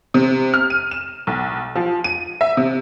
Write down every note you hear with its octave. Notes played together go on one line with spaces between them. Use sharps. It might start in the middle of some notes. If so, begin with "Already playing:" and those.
C3
F6
D#7
E7
B1
F3
D#7
E5
C3